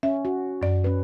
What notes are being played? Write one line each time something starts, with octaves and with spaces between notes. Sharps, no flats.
C#4 E5
F#4
F#2 D5
C#4 B4